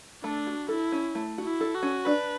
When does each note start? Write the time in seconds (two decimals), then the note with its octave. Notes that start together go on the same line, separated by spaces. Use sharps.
0.24 A3 D4
0.47 F#4
0.69 E4 A4
0.92 C#4
1.15 A3
1.38 F#4
1.44 E4
1.61 A4
1.75 F#4
1.83 C#4
2.05 D4 B4